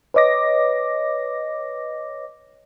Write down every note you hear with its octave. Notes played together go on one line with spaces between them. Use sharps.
B4 C#5 D#5 D6 A#6